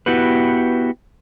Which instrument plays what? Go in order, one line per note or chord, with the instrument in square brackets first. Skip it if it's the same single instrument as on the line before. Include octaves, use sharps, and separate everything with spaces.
[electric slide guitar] B3 E4 F#4 G4 B4